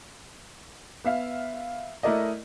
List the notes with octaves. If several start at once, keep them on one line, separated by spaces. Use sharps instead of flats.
B3 E5 F5
A3 E4 A#4 D5 D#5